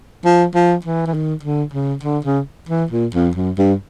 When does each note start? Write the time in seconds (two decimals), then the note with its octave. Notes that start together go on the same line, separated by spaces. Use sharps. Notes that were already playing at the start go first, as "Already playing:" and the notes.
0.25 F3
0.55 F3
0.85 E3
1.06 E3
1.14 D#3
1.43 D3
1.73 C#3
2.03 D3
2.25 C#3
2.69 E3
2.91 A#2
3.14 F2
3.35 F#2
3.58 G2